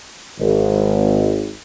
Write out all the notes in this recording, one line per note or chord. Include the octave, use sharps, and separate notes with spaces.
G#1